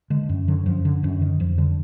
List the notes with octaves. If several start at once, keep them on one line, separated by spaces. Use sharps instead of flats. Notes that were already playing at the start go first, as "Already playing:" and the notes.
D3 G#3
F#2
D3 F#3
F#2 F3
D3
F#2 D#3
D3 D#3
F2 F3
D3 G3